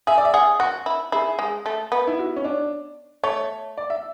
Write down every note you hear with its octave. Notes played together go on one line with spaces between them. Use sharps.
G#4 E5
D5
E5
G#4 F#5
F#4 F#5
E4
E4 G#4
G#3
A3
B3
E4
F#4
C#4
D4
A3 C#5
D5
E5